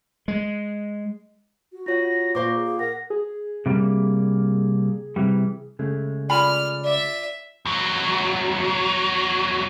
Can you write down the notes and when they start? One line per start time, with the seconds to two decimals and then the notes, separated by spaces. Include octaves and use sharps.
0.28 G#3
1.73 F#4
1.86 F4 C#5 F#5 A#6
2.35 A#2 C5 F5 C#6 D6
2.55 G#4
2.66 G#4
2.79 A#4 F#5 A#6
3.10 G#4
3.66 C3 G3 A#3
5.16 C3 E3 G3
5.79 C#3 G#3 A3
6.30 F4 D5 G#5 B5 F6
6.84 D5 E5
7.65 E2 F#3